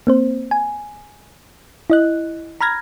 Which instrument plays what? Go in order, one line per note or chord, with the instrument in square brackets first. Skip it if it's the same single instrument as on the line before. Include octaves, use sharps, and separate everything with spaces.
[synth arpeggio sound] A#3 C4 C5
G#5
E4 D#5 F#6
A#5 B5 F6 G#6 A#6